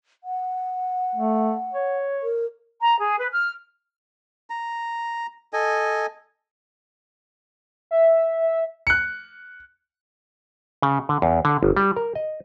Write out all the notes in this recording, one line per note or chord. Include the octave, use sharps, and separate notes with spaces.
F#5
A3
C#5
A#4
A#5
G#4
B4
F6
A#5
A4 D#5 G#5
E5
F#6 C#7
C#3
D3
E2
D3
G1
G3
A#4
D#5